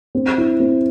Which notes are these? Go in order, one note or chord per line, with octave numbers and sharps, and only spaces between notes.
C4
E4
C4